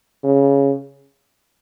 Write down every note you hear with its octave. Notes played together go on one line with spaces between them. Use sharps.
C#3